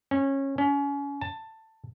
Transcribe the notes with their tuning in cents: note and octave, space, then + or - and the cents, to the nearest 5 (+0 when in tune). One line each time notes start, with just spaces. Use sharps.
C#4 -20
C#4 +30
A5 +15